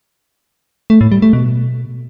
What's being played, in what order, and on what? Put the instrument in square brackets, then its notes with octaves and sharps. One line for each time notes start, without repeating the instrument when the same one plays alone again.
[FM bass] A3
A2
G3
A3
B2